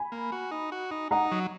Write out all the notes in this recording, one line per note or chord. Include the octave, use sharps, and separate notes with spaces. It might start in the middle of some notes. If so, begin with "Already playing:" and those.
Already playing: G#5 B5
A#3
F#4
D#4
F#4
D#4
D#4 F#5 A#5
F#3